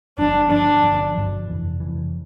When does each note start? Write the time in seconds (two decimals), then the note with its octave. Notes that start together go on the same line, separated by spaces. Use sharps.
0.18 G1 G2 F3 D4
0.50 G1 G2 F3 D4
0.83 G1 G2 F3
1.15 G1 G2 F3
1.47 F1 F2 E3
1.80 F1 F2 E3